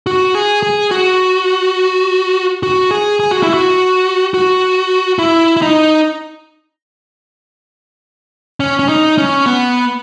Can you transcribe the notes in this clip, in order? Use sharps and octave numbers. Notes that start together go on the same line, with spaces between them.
F#4
G#4
G#4
F#4
F#4
G#4
G#4
F#4
E4
F#4
F#4
E4
E4
D#4
C#4
C#4
D#4
C#4
B3